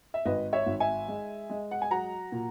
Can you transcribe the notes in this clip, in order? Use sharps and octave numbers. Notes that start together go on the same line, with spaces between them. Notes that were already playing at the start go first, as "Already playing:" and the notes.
E5
G#1 B4 D#5
C#5 E5
G#1
E5 G#5
G#3
G#3
F#5
G#5
F#3 F#5 A#5
A#2